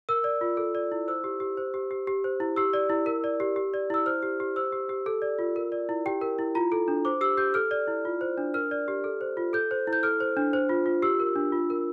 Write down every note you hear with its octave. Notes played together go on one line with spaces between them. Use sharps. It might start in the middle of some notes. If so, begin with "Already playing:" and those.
A#4 E6
D5
F4
A4
D5
E4
C5 E6
G4
G4
C5
G4
G4
G4
C5
E4
G4 E6
D5
E4
A#4
D5
G4
G4
D5
E4 E6
C5 F6
G4
G4
C5 E6
G4
G4
A4
D5
F4
A#4
D5
E4
G4 G5
A#4
E4
F4 A#5
A4
D4
C5 D6
G4 E6
G4 G6
A4 F6
D5
E4
F4
C5
D4
A#4 F6
D5
G4
A4
C5
F4
A4 G6
C5
E4
G6
A4 F6
C5
D4
C5
F4
F4
G4 E6
A#4
D4
F4
A#4